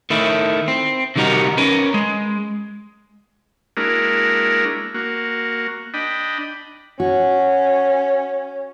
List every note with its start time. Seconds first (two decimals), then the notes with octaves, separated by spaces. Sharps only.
0.10 D#3 A3 E4
0.68 C4
1.16 C3 D#3 G3 D#4 F#4 A#4
1.58 C#4 A#4 B4
1.94 G#3
3.77 G#3 A#3 D4 E4 F#4 A#4
4.94 A#3 F#4
5.94 D4 D#5 G5 B5
7.00 C#4 F#4